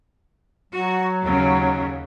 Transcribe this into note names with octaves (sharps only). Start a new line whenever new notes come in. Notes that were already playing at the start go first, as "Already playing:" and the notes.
F#3 F#4
D#2 C#3